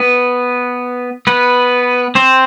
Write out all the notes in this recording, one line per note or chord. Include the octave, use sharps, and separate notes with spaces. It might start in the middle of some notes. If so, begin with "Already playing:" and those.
Already playing: B3 B4
B3 B4
C4 C5